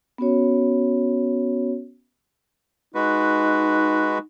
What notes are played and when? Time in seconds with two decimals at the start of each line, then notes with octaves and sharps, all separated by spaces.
0.18 B3 C#4 F#4 C#5
2.95 G#3 D#4 F#4 B4